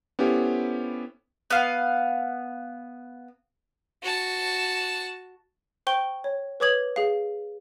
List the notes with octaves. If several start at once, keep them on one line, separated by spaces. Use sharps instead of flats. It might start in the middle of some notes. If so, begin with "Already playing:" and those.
B3 C#4 E4 G4 A4 C5
B3 F5
F#4 A5
C5 G5 C#6 G6 G7
C#5
B4 C#5 D6 D#6 G#6 F#7
G#4 F5